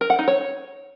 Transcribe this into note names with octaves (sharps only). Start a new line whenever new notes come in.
A#4
F#5
D#4
C#5